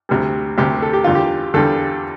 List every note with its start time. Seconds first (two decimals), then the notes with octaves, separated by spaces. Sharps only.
0.09 D2 C3 G3
0.58 D2 C3 G3 G4
0.82 A4
0.93 G4
1.04 E2 D3 G3 F4
1.15 G4
1.54 E2 D3 G3 A4